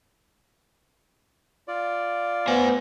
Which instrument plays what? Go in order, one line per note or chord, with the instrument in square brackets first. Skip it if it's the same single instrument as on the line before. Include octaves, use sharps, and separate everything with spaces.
[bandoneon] F4 D5
[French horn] B3 [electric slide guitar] C5 G#5